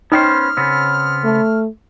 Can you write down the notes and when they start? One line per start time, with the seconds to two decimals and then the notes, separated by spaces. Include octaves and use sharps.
0.12 B3 C#4 D#4 C5 G5 F6
0.57 C#3 B3 C4
1.24 A3